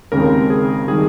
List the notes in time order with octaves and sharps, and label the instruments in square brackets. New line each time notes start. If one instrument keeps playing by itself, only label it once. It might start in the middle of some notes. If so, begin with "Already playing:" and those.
[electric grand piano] D#2 C#3 G#3 C4 A#4
G#4
D#3 G3 G#4